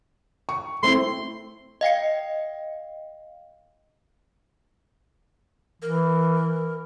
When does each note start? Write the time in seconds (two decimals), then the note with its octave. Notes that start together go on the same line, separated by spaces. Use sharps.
0.49 C#6
0.83 A3 C4 E4 C6
1.81 D#5 F5 G5 C#7
5.82 E3 A#4